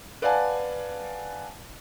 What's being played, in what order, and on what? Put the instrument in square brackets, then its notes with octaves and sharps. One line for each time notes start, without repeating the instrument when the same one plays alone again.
[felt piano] B4 D5 F5 F#5 G#5 A5